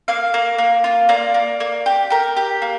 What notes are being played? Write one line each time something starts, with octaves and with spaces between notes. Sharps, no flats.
A#3 F5
A#3
A#3
F4
A#3 D5
A#3
A#3
G4
G4 A#4
G4
A#3